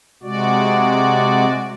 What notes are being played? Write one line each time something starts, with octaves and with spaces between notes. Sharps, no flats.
C3 G#3 F#4 D5